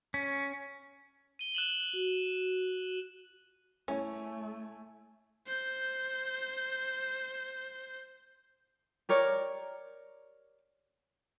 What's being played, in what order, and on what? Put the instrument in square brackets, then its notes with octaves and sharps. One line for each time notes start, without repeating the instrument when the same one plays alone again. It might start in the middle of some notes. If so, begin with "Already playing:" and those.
[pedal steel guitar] C#4
[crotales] D#7 G7
F#6 E7 F#7
[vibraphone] F#4
[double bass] A3 [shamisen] C#4 [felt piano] E4 C#5 G#5
[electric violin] C5 G6
[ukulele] G4 A#4 C#5 D5